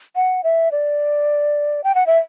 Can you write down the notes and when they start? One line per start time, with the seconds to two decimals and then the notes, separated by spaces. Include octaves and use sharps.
0.16 F#5
0.44 E5
0.72 D5
1.84 G5
1.95 F#5
2.07 E5